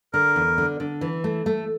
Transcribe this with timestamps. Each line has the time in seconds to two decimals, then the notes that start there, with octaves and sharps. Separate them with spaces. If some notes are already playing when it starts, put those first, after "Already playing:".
0.13 D3 A#4
0.36 E2
0.58 D3
0.80 D3
1.01 E3
1.24 A3
1.46 A3